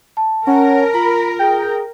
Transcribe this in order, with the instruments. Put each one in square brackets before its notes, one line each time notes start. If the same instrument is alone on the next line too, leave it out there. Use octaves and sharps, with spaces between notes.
[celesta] A5
[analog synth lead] C#4 [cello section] A#4 [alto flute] F#5
[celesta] F4 [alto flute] A#5 [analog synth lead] B5
[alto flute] G#4 [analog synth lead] G5